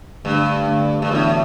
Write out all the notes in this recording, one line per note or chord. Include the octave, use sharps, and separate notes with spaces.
G2 D3 A3 D4
D3 A3 D4
G2
A2 E3 B3 D4 F#4